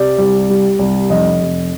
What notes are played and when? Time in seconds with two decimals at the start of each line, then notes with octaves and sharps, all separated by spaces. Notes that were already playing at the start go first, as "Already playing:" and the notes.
Already playing: C3 D5
0.18 C2
0.50 G3
0.79 C2
1.10 F1 D#5
1.41 F1